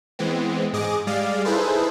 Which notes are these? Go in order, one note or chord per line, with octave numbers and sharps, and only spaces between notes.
E3 G#3 B3 C4
G#2 G#4 D#5 D6
G3 G#3 D5 F5
D#4 E4 G#4 A4 B4 C5